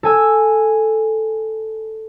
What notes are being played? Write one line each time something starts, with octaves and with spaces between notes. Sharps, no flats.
A4 G#5 E6